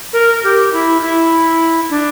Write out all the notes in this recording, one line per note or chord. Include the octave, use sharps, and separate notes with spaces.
A#4
G4
E4
E4
D4